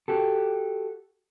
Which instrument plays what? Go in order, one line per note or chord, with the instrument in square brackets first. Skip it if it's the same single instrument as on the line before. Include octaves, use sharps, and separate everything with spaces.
[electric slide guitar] F#4 G4 A4